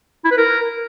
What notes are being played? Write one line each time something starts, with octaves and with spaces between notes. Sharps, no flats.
E4
B4
A#4